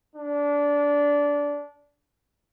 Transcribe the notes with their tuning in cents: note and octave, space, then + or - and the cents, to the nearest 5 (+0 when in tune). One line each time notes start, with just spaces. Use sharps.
D4 -20